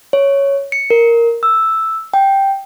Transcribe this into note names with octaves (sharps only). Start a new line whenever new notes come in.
C#5
C#7
A#4
E6
G5